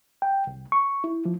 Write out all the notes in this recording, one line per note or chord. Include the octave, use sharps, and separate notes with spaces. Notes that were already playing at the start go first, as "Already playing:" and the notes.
G5
C2
C#6
E4
F3